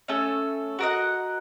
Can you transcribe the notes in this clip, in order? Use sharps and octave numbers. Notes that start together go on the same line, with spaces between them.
A3 C#4 A4
F#4 A#4 D#5 F#5